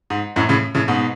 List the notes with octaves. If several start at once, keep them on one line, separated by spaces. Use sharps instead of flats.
G#2
F#2 A2
A2 C#3
A2 C#3
G#2 B2